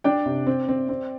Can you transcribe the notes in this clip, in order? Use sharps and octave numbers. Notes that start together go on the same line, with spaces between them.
D4 D5 G5
C3
C4
C4
C4